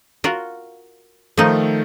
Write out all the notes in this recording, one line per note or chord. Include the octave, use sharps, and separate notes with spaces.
F4 F#4 A#4
D#3 F3 A3 D#4 A4